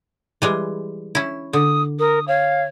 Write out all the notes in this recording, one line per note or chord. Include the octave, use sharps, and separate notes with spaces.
E3 G3 G#3
C#4 E4
D3 D#6
A#4 D#6
C#5 F5